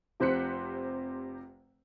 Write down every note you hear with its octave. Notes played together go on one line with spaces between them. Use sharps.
F1 C3 C5 F#6 B6 C#7